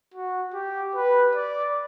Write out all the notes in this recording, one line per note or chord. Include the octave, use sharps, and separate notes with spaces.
F#4
G4
B4
D5